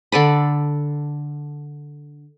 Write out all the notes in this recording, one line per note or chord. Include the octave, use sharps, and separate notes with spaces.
D3 A4 D5 B5